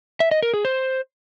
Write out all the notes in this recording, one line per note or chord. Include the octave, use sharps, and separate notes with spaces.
E5
D#5
A#4
G#4
C5